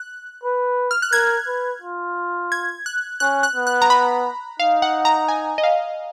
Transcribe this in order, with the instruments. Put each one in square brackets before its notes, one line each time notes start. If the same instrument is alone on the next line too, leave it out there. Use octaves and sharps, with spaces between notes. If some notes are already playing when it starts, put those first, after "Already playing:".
Already playing: [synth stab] F#6
[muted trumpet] B4
[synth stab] F6
F#6
[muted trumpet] A#4 [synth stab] G#6
[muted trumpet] B4
F4
[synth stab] G#6
F#6
[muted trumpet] C#4 [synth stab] F#6
[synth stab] F#6
[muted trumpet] B3
[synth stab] F#6
A#5
B5
[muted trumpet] D#4 [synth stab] F5
[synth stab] F#5
A#5
G#5
D#5
F5